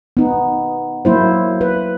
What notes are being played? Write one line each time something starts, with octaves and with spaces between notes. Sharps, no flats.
B3 D#4
F#3 A#3 E4 C5
B4